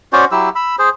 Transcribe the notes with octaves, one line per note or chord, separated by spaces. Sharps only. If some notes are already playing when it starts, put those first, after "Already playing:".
C#4 F#4 C5 D5
F#3 E4 G4 E6
B5 E6
G#4 C5